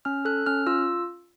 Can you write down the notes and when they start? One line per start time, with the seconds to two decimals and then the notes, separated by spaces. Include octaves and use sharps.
0.05 C#4 F6
0.25 A4 F#6
0.46 C#4 F6
0.67 F4 E6